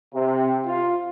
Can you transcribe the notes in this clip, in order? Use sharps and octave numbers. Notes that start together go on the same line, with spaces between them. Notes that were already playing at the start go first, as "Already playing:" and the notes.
C3
F4